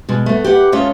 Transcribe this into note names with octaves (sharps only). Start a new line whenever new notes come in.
B2 G#3
A3 B3
G4 B4 F#5
G#3 A3 C#4 F4 C#5 D#5